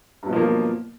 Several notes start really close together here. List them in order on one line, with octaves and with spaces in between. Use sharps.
G2 F#3 B2 F3 A#3